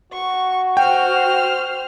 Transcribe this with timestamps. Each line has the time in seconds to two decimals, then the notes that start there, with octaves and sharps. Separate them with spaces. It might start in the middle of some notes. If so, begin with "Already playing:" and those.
0.13 F#4 C#6
0.77 C5 G5 F6